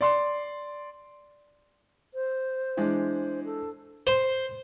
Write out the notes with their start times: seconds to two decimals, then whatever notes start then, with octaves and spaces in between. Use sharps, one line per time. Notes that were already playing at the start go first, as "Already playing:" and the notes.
0.01 D5 C6
2.14 C5
2.77 E3 G#3 D4
3.45 A4
4.07 C5